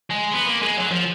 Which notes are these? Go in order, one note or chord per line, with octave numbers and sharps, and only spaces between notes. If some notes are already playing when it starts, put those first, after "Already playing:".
G#3
B3
A#3
G#3
F#3
F3